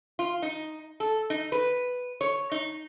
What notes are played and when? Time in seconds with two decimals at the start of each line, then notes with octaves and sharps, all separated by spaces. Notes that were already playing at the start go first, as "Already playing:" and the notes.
0.19 F4
0.42 D#4
1.00 A4
1.30 D#4
1.52 B4
2.21 C#5
2.51 D#4